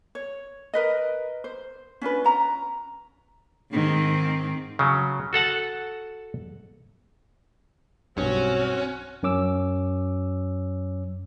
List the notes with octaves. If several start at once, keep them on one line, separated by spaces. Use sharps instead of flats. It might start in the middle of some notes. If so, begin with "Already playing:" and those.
C#5
A#4 B4 D#5
C5
C#4 D4 F4 B4
C#4 A#5
G#2 D#3 C4
C#3 F#3
F#4 A4 F#5 A5
B1 G2 C4 C#4 F#4
F#2 C#4 D6 E6